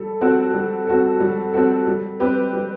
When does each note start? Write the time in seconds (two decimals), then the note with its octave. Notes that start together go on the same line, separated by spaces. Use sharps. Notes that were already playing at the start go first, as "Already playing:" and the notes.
Already playing: G3 A4
0.21 C4 F#4 A4
0.54 G3
0.87 C4 F#4 A4
1.20 G3
1.53 C4 F#4 A4
1.87 G3
2.20 C4 G4 B4
2.53 G3